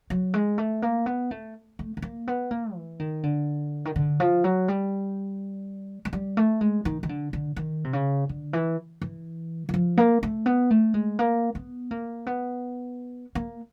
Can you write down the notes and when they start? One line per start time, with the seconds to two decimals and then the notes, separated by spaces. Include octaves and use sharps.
0.10 F#3
0.34 G#3
0.58 A3
0.82 A#3
1.06 B3
1.31 A3
1.79 A3
1.97 A3
2.02 A#3
2.28 B3
2.51 A#3
2.75 E3
3.00 D#3
3.23 D3
3.85 D#3
3.96 D3
4.20 F3
4.44 F#3
4.68 G3
6.05 G#3
6.13 G3
6.37 A3
6.61 G#3
6.85 D#3
7.03 D#3
7.09 D3
7.33 D3
7.56 D#3
7.84 C3
7.93 C#3
8.29 D3
8.53 E3
9.02 E3
9.69 E3
9.74 F3
9.97 A#3
10.23 A3
10.46 B3
10.71 A3
10.94 G#3
11.19 A#3
11.55 B3
11.91 A#3
12.27 B3
13.35 A#3